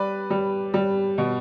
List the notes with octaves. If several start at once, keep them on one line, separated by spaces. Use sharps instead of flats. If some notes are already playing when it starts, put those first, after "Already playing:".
Already playing: G3 B4 D5
G3
G3
B2